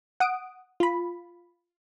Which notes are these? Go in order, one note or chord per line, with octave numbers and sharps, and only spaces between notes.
F#5 D#6 D7
F4 B5